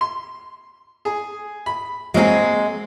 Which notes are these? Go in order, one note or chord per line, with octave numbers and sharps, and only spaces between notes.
C6
G#4 G#5
B5
F#3 G#3 A#3 C4 G#4